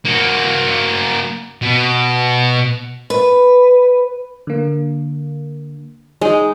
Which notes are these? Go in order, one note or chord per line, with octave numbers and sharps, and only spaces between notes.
A#3 F#4
B2
B4
D3 A#3
G#3 D#4